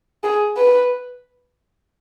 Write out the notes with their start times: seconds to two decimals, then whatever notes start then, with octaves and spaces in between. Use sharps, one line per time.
0.24 G#4
0.57 B4